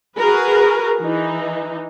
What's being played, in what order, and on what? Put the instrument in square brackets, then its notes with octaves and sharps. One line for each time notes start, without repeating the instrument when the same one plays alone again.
[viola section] F#4 G#4 A#4 B4
E3 D#4